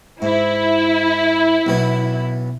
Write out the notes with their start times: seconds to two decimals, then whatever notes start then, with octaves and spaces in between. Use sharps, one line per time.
0.22 G#2 E4
1.67 B1 F#3 B3